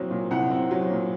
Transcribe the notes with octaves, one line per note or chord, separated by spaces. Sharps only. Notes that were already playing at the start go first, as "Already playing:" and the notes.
Already playing: C2 A#2 F#3 C4
A#2
C2 F#5
C4
F#3
A#2